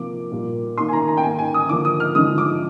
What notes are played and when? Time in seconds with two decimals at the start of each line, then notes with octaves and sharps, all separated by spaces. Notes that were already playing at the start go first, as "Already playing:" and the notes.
Already playing: C3 F3 A#3 D6
0.32 A#2 G3 A#3
0.78 D#3 A#3 C6
0.89 G#5
0.93 A#5
1.08 A#5
1.17 G5
1.23 D#3 A#3 G#5
1.39 G#5
1.54 D#6
1.69 D3 F3 A#3 D6
1.85 D#6
2.00 F6
2.15 D3 F3 G#3 D#6
2.38 D6